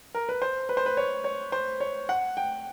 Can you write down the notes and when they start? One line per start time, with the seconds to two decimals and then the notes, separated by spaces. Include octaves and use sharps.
0.15 A#4
0.29 B4
0.42 C5
0.69 B4
0.77 C5
0.86 B4
0.97 C#5
1.24 C#5
1.52 C5
1.80 C#5
2.09 F#5
2.37 G5